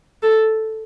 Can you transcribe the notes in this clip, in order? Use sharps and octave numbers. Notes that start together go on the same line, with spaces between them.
A4